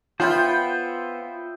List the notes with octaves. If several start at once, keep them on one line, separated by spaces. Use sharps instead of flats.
B3 F4 C5 E5 G5 B5